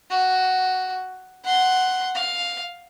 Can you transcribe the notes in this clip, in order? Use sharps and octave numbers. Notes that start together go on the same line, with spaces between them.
F#4
F#5 C6
F5